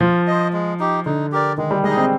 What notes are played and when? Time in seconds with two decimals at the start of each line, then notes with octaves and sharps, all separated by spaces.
0.01 F3 F4
0.27 C5 D#5
0.53 G#3
0.79 D#4 G4
1.05 D3 D#4
1.32 G4 A#4 D5
1.58 D#3 G#3
1.71 G3
1.83 G#3 D#4 G#4 D#5
1.97 C4